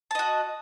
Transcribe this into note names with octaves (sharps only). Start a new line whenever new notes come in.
F#4 D#5 A5